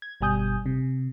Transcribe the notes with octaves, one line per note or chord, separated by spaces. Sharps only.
G#6
G1 B2 G3 G#5 D#6 G6
C3